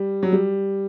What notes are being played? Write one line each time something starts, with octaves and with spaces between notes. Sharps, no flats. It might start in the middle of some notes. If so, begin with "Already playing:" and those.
Already playing: G3
F#3
G3